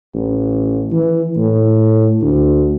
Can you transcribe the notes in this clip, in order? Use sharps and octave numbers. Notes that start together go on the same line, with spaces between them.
A1
E3
A2
D2